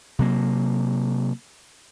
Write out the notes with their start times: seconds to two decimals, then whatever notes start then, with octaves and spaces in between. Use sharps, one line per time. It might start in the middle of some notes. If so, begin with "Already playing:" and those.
0.19 C3 F#3 A#3